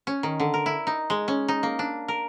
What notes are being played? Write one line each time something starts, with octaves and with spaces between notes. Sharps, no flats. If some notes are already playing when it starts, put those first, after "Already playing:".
C#4
D#3
D3
A#4
E4
D#4
G#3
C#4
D#4
A#3
D4
A#4